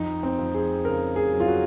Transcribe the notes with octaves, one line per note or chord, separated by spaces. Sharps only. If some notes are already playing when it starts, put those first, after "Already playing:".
Already playing: F2 D#4
C4
F2
G#4
C#3 A#4
G#4
F#3
F4
F#4